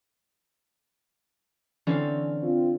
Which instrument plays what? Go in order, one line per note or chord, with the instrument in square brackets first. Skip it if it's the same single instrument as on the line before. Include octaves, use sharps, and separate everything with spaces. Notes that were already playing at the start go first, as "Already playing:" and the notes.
[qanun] D3 C4 F5 [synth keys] E3 C#4
[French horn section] C4 F4